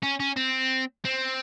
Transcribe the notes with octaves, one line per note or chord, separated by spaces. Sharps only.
C#4
C#4
C4
C4